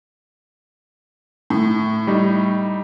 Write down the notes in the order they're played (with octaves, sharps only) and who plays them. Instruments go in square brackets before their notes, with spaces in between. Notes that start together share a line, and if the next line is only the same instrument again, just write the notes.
[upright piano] A2
[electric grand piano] G3 D#4